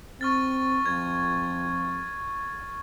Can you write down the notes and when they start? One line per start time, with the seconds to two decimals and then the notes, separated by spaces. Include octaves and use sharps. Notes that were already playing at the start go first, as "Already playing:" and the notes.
0.21 C4 C#6 F6 A6
0.86 F2 G#6